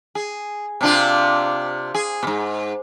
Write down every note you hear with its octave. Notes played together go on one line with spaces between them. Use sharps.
G#4
C3 D4 F4
G#4
G#2 B2